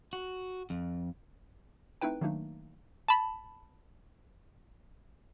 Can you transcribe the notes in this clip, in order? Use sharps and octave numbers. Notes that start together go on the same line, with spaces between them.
F#4
F2
A3 C4 D#4 E4 B4 G5
D#3 F#3 A3 A#3 D4 D#4
A5 B5